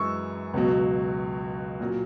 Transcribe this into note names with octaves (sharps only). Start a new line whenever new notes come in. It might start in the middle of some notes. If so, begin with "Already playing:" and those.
Already playing: F#2 E3 G#3 C#6 E6
C#2 B2 F#3
A#2 F#3